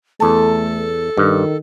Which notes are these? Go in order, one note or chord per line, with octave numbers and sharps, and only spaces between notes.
E2 A3 A4 A5
G2 D#3